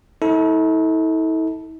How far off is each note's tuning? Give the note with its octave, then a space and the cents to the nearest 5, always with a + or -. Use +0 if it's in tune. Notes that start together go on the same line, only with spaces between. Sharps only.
E4 -45 A4 +0